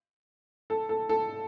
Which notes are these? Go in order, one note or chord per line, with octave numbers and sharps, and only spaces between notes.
A4
A4
A4